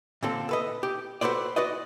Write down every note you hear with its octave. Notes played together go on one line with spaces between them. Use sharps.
A#2 D3 C4 A4
A4 B4 D#5
G4
F#4 A4 B4 C5 D5
F#4 B4 D5 D#5